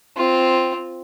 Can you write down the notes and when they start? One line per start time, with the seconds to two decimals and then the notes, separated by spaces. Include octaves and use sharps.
0.17 C4 F4